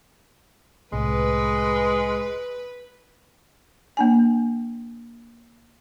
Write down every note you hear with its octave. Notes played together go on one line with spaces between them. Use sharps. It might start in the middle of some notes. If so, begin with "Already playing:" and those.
C2 A2 G#3 B4
A#3 D4 G#5